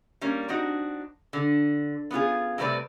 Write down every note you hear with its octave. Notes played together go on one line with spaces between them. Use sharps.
G3 A#3 C#4
C4 D4 D#4 F#4
D3
B3 C#4 F4 G#4
C3 G3 A3 C4 B4 D5